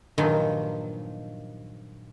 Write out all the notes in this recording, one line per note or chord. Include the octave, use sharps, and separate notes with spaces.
G2 A#2 D#3 F3 F#3